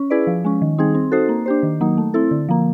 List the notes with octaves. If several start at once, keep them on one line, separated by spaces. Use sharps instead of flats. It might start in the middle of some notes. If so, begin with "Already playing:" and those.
Already playing: C#4
E4 G#4 B4 D5
F3
G#3 C#4
D#3
G3 C4 D#4 G#4
C4
D#4 F#4 A4 C5
A#3
D4 G4 C5
D#3
F#3 A#3 D#4
A3
C4 E4 A4
D3
F3 A#3